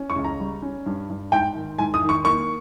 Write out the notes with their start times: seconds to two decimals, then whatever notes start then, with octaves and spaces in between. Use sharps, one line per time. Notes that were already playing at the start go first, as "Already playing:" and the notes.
Already playing: C#4
0.10 C#6
0.16 C#2
0.24 A#5
0.40 G3
0.62 C#4
0.86 G2
1.10 G2
1.32 G#2 G5
1.55 D#3
1.78 G#2 G#5
1.94 D#6
2.02 D#3
2.09 C#6
2.24 A#3 C#6